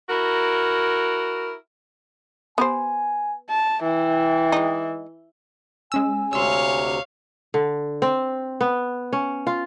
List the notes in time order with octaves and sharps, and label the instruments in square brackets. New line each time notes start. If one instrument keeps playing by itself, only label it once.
[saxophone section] E4 F#4 A#4
[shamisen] B3 G4 C5 [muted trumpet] G#5
[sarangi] A5
[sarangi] E3 [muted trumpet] G5
[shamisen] G#3 D#4
[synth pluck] G#3 C#4 E6 [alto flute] G#5
[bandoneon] D2 C3 [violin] C#5 F5 [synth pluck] C6 E6
[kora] D3
C4
B3
C#4
F4